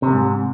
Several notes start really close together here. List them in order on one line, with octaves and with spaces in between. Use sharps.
C3 F2 G#2